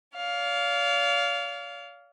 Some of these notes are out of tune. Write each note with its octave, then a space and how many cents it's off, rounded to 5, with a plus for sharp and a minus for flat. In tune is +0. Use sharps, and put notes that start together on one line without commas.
D5 -45 F5 +0